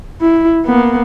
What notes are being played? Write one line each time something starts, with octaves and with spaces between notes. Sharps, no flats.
E4
A#3 B3